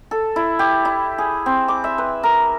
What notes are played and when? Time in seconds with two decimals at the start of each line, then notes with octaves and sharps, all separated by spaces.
0.11 A4
0.36 E4
0.59 G4
0.85 E4
1.18 G#4
1.46 C4
1.68 D6
1.84 E5
1.98 B4
2.23 A#4